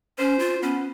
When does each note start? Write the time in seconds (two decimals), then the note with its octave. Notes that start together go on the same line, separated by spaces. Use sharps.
0.18 C#4 C5
0.39 F4
0.63 B3 C#4